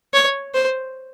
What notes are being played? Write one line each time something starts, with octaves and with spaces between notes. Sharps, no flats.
C#5
C5